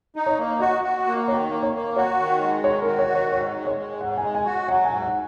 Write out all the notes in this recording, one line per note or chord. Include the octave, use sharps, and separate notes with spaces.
D#4
C#5
A#3
F#4 D#5
F#4
A#3
D#3 C#5
A#3
C#5
A#3
F#4 C#5
D#3
G#3
D#3 C#5
F#4 A#4
C#5
D#3
C#5
G#2 C#5
G#3
C#5
G#3
G#2 F#5
G#3 G#5
G#5
F#4
F#3 F#5
G#5
G#2
F#5